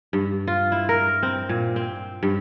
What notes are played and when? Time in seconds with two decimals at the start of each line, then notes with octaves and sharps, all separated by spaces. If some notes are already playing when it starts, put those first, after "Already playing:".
0.13 G2
0.47 F4
0.72 E4
0.89 A#4
1.23 C4
1.49 A#2
1.76 C4
2.23 G2